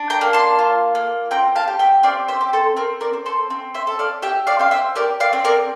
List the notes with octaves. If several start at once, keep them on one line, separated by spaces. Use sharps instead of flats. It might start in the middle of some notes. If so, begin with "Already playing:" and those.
Already playing: D4
G5 A#5
A#3
A5 C6
F4
A#3
C4 G5 A#5
F5 A5
G4
E5 G5
C4 D5 F5
C5 E5
G4
A4 C5
C4 A#4
A#4 D5
C4
A4 C5
C4
C5 E5
A4
D5 F5
G4 E5 G5
D5 F5
C4 F5
C5 E5
G4 A#4 D5
D5 F5
C4
A#4 D5